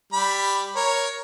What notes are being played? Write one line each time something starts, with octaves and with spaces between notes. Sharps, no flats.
G3 B5
A#4 C#5